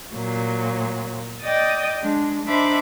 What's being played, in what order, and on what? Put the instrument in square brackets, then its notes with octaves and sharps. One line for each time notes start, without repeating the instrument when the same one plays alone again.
[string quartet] A#2 F#3
D5 D#5 G5 D#6 A6
G#3 D4
D4 D#4 C5 E5 B5 D6